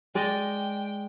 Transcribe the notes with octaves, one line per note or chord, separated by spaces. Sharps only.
G#3 D5 D#5 G5